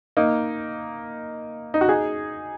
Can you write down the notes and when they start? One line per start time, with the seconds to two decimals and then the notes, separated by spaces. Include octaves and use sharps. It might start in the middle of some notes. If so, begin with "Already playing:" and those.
0.17 A#3 D#4
1.74 D#4
1.81 F#4
1.89 D#4 G#4